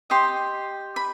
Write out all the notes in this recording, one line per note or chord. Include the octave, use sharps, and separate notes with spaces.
G4 D#5 C6
B5